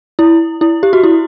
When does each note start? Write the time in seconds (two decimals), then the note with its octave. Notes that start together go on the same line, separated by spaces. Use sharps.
0.19 E4
0.61 E4
0.83 G4
0.93 F#4
1.03 E4